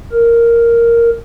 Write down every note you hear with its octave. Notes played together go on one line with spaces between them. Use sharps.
A#4